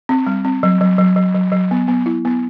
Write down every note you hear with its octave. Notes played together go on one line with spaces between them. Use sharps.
C4
G3
C4
F#3
F#3
F#3
F#3
F#3
F#3
B3
B3
E4
B3